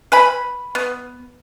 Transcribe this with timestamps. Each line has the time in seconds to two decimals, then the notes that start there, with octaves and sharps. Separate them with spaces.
0.12 B4 G#5 B5
0.75 B3